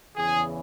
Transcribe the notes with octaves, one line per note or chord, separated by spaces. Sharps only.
E2 C#3 E3 G#4